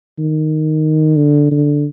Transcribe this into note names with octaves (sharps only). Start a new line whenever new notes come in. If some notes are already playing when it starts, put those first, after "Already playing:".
D#3
D3
D3